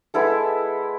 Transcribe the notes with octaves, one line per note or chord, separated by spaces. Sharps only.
G#3 B3 E4 A4